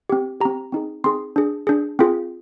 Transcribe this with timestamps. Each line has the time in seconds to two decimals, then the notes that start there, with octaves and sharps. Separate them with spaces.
0.09 C4 G4
0.41 C4 G4 A#5
0.72 C4 D#4 G#4
1.04 C4 D#4 G#4 C6
1.36 D4 G#4
1.67 D4 G#4
1.99 C4 F4 G#4